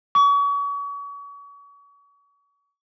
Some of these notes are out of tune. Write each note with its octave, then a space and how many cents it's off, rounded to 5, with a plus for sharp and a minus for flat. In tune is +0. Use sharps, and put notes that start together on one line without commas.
C#6 +40